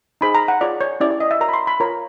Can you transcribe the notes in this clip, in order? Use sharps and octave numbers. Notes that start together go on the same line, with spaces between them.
D#4 G#4 C5 B5
A#5
F#5
F4 G#4 C#5 D5
C#5
C#4 E4 G4 D5
D5
D#5
E5
F#4 A#4 C#5 A#5
B5
C6
B5
F4 A#4 C#5 A#5